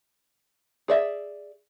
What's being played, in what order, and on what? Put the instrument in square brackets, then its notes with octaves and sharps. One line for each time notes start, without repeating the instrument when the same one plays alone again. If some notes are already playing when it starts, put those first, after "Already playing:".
[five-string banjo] G#4 D5 E5